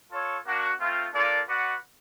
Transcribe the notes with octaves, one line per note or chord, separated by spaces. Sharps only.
F4 A4 C#5
A#3 D4 F#4
A3 C4 F4
A#3 D4 F4 A4 D5
F#4 B4 D5 F#5